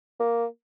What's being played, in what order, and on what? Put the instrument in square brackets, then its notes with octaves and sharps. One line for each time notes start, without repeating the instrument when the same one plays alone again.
[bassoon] A#3